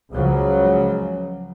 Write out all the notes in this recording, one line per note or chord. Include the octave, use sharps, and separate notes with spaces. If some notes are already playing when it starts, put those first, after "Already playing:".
C#2 C#3 F3 F#3